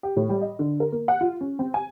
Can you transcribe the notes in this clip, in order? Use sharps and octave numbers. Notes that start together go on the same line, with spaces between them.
G4
A2
G3
D#5
D3
A#4
A#3
F#5
F4
C#4
C4
G#5